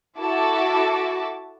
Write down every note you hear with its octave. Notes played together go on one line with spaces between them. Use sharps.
E4 F#4 A4 A5 D6